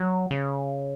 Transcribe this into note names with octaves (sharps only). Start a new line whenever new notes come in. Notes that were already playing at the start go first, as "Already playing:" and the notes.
Already playing: F#3
C#3